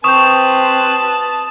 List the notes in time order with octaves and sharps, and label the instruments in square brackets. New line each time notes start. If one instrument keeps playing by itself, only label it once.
[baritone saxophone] C4 [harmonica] B4 A5 [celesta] C#6 G6 [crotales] D#6 E7